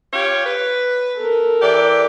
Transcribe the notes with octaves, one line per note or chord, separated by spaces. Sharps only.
F4 G4 C#5
B4
A4 A#4
E3 G4 D5